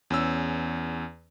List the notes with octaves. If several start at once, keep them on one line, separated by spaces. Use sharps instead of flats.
E2 C#4 E6